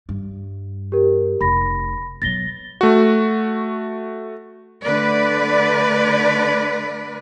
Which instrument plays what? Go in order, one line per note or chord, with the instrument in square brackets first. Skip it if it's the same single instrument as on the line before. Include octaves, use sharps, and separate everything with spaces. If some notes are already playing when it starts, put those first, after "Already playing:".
[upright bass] G2
[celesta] G4 A#4
[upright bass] F1 [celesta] B5 A#6
[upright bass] B2 F#3 [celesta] A6 A#6 G7
[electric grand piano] A3 F#4
[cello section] D3 A3 B4 D5